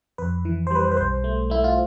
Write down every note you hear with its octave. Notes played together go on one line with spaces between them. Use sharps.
F2 B4
E3
C5
G3 B4
C5
B4
B1 C5
A3
A3 E4
F4